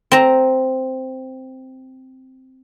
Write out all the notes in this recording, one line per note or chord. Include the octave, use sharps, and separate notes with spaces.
C4 A#5